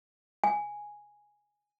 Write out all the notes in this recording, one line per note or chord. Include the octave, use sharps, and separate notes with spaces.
G#5